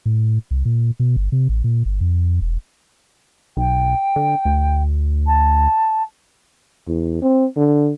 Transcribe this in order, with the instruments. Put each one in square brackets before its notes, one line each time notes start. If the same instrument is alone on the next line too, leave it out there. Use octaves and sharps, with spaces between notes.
[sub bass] A2
C2
A#2
B2
G1
C3
A1
A#2
G1
F2
E1
[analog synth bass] B1 [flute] G5
[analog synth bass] D3
D2
[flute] A5
[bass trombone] E2
C4
D3